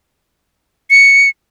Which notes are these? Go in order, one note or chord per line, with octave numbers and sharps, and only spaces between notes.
C#7